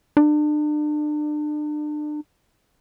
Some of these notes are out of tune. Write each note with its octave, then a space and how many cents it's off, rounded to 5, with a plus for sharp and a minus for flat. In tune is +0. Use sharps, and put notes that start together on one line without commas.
D4 +35